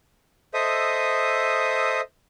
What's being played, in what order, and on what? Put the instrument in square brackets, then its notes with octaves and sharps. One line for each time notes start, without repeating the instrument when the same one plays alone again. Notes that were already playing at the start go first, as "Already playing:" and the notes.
[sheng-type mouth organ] A4 C5 D#5 E5 D#6